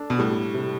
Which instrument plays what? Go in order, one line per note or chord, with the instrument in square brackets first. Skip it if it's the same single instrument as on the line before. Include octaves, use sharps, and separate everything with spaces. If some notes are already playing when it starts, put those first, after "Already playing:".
Already playing: [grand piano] D4 A4
[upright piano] B2
[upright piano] A2 [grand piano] G3
[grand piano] C3